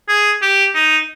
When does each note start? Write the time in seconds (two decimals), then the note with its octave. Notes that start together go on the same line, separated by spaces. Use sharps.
0.09 G#4
0.42 G4
0.75 D#4